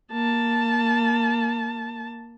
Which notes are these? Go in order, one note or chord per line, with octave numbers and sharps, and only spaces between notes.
A#3 A5